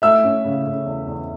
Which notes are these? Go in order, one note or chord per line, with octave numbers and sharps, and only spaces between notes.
A3 E5 E6
C#4
C#3
C#3
E2
E2